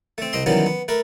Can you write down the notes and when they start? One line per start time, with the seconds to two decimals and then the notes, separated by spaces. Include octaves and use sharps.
0.18 A3 C4
0.33 C2 C4 D#5 C6
0.46 D#3 E3 F#3 G3 B3 C#4
0.66 B3
0.88 A3 A#4 B4